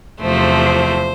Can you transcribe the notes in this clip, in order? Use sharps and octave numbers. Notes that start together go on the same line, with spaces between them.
E2 C3 F3 A3 C5